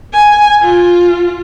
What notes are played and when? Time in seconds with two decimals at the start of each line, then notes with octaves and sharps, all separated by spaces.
0.14 G#5
0.63 F4